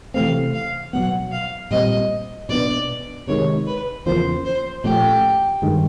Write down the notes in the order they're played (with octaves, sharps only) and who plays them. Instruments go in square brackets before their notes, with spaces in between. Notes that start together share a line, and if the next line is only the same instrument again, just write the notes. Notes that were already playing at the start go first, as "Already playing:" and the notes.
[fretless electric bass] C3 E3 A3 C4 [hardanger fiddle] F5
[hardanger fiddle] F5
[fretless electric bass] B2 F#3 B3 [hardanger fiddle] F#5
[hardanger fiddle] F5
[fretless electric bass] A#2 G3 C4 [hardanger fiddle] D#5
[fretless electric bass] B2 G3 B3 D4 [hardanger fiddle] D5
[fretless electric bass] C3 D#3 G#3 [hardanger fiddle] C#5
[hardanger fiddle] B4
[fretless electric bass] E2 C#3 F3 A#3 [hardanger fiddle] C5
[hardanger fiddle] C5
[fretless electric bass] A#2 F3 A3 C#4 [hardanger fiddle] G4
[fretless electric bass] G2 D#3 G#3